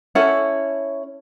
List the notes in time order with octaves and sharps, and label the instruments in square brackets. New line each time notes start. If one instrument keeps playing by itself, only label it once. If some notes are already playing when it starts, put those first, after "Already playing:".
[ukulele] C#4 E4 A4 F#5